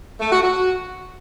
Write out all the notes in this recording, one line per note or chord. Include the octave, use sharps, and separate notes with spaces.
A3
F#4
F#4